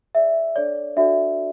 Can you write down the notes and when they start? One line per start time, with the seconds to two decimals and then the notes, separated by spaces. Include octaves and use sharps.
0.15 G#4 D5 E5
0.56 D4 A4 C#5 D5
0.96 D4 F#4 A4 D5 E5